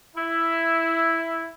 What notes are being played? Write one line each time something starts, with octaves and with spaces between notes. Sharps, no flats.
E4